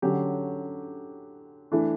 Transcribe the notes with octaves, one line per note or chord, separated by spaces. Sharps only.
D3 F#3 C#4 G4
E3 A3 D4